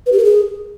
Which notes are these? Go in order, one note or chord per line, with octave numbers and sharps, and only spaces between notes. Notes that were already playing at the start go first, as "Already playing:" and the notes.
B4
G4
A#4
G#4